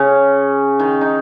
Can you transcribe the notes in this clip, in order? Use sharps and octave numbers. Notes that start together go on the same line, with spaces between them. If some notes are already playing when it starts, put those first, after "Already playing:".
Already playing: C#3 C#4
D#3 D#4
D#4